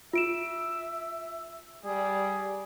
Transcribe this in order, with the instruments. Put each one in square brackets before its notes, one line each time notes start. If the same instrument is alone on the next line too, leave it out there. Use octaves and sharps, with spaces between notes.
[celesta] F4 D7 E7 [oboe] E5
[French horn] G3 [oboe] G#4